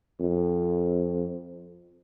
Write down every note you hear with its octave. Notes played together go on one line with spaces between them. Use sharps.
F2